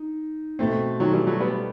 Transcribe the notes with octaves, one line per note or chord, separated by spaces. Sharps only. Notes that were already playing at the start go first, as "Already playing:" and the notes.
Already playing: D#4
B2 A3 C4
D#3 F#3
E3 G3
F#3 A3
G3 B3